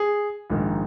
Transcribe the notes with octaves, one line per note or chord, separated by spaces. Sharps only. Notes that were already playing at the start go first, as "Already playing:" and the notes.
Already playing: G#4
A#1 G#2 D#3